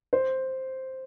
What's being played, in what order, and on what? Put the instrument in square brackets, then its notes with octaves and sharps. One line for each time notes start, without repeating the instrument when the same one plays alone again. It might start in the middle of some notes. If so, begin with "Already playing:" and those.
[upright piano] C5